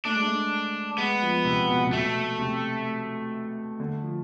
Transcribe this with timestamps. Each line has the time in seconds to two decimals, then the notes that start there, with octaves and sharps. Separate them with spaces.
0.05 A3 D4
0.15 G#3
0.26 A3
0.98 G#3 B3
1.22 F3
1.45 C3
1.69 B2
1.87 C3
1.92 B2 A3
2.39 C3
3.80 D3
4.03 F3